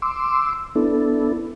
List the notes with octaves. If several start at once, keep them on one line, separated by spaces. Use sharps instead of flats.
C6 D6 E6
B3 D4 E4 A4